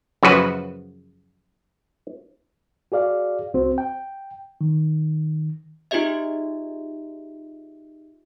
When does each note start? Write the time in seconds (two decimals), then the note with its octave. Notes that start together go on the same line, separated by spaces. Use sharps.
0.23 F#2 C#3 F3 F#4 B4
2.92 F#4 G#4 D5 F5
3.54 C2 C4 F#4 C5
3.78 G5
4.61 D#3
5.91 D#4 F4 G4 G#4 D#5 E5